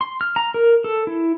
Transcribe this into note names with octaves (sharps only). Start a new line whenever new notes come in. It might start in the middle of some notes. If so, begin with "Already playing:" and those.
C6
F6
A#5
A#4
A4
E4